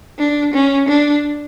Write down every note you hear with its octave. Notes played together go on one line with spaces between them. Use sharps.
D4
C#4
D4